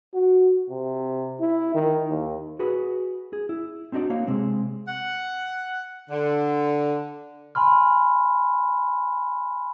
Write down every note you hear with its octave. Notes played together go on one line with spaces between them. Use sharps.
F#4
C3
E4
D#3
D#2
F#4 G#4 B4
G#4
E4
C4 D4 D#4 F#4 D5
A#3 C#5 F5
C3 G#3 C4
F#5
D3
G#5 B5 C6 F6